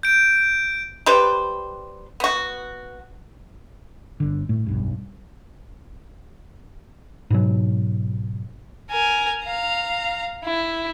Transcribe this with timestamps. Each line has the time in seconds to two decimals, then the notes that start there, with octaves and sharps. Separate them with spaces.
0.03 G6 D7
1.06 G3 G4 B4 C5
2.20 B3 F#4
4.20 G1 D3
4.49 A2 A3
4.66 F1 B1 G2
7.30 G#2 B2 F#3
8.90 A#4 G#5
9.45 F5 A#5
10.44 E4